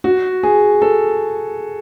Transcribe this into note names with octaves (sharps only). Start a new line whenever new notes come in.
F#4
G#4
A4